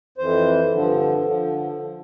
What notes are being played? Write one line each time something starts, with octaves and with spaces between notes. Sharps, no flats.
F2 E3 C5
G2 D3 F3
D3 F3